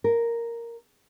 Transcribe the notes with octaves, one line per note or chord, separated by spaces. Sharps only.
A#4